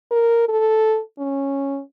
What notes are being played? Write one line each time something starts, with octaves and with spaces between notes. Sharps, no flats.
A#4
A4
C#4